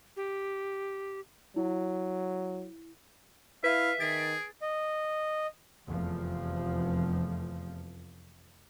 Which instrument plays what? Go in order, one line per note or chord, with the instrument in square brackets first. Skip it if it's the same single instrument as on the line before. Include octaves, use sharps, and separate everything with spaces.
[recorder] G4
[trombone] F#3 [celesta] E4
[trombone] E4 [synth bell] B4 [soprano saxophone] E5 [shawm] F5
[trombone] D#3 [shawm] G#4 [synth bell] A6 D7
[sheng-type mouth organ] D#5
[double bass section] F1 E2 F3